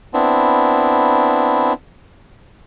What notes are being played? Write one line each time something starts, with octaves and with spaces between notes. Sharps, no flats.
B3 C4 D4 E4